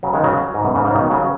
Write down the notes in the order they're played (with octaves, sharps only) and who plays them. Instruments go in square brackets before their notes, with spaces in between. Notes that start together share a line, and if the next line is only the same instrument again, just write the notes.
[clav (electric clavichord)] C#3 F#3
D#3 G#3
C#3 F#3
G#2
F#2 B2
G#2 C#3
G#2 C#3
B2 D#3
C#3 F#3